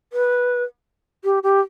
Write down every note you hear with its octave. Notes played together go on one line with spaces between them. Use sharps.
B4
G4
G4